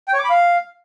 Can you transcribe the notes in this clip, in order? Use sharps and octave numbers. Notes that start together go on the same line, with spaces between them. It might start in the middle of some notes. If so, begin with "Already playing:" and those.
G5
C#5
D6
B5
F5